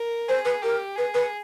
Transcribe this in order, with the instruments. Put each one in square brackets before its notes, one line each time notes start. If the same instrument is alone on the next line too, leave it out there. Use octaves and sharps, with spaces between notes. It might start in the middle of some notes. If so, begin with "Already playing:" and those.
Already playing: [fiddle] A#4
[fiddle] G#4 [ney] C5
[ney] B4
[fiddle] G4 [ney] A#4
[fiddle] G#4 [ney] B4
[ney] B4